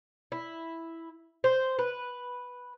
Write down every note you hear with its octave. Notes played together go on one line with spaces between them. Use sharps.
E4
C5
B4